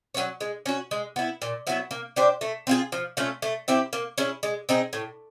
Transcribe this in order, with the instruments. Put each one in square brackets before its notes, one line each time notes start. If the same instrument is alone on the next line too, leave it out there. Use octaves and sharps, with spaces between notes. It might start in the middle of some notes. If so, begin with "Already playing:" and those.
[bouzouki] F#3 A#3 C#4
G#3
C#4 F#4
G#3
B3 E4
A#2
F#3 B3 E4
A#3
D4 G4 C5
A3
C4 F4 G#4
F3
A3 C#4 F4
A3
C4 E4 G4
A#3
C#4 E4 G#4
G#3
C4 D#4 G#4
A2